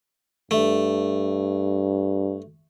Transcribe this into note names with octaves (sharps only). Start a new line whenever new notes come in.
G2 A3